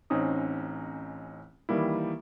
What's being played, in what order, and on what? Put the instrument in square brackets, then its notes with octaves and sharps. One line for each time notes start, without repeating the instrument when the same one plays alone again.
[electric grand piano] A1 C4 C#4 D#4 D#6
D#3 E3 G3 A#3 E4